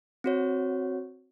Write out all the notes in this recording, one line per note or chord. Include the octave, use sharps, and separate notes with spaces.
C4 F#4 C#5